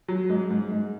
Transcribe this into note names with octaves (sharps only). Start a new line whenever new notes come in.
F#3
G#2
G#2
G#2